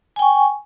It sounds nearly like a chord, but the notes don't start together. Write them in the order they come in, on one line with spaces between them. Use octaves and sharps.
G#5 G5 C#6